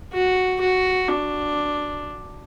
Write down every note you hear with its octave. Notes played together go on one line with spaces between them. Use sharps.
F#4
F#4
D4